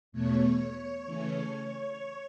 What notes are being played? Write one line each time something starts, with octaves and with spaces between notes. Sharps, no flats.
E2 B2 A3 C#5
C#3 E3 A3 C#4